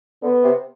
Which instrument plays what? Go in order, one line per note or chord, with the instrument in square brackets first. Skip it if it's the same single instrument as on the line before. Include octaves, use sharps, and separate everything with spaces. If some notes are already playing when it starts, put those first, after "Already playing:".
[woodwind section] D3 [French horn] B3
[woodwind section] C3